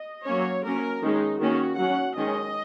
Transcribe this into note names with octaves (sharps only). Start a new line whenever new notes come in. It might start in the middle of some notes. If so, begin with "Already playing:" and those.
Already playing: D#5
F#3 A#3 C#4 C#5
F#3 A#3 C#4 A#4
D#3 G#3 C#4 D#4
D#3 A#3 C#4 F#4
F#3 C#4 F#5
D#3 G#3 C#4 D#5